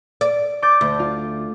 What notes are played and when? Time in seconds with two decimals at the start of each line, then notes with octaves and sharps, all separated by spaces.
0.21 D5
0.62 D6 G6 A6
0.81 D2
0.99 F4